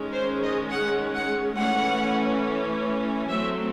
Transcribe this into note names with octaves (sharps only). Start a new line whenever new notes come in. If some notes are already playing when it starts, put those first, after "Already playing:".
Already playing: D#3 G#3 C#4
C5
D#5
F#5
F#5
E3 A3 C#4 F#5
F#3 A3 C4 E5